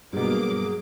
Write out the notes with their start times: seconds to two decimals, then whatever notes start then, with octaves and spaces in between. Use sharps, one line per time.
0.13 G2 B2 F#3 A#3 G#4 D6